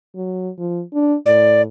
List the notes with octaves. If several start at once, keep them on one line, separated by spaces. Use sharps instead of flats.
F#3
F3
D4
A2 D5